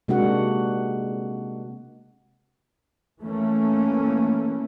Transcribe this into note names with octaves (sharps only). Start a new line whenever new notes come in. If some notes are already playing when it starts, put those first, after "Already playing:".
C3 G#3 A#3 D4 F#4 F#5
E3 A3 A#3 C#4